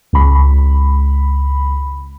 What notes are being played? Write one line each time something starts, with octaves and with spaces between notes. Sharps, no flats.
C#2 B5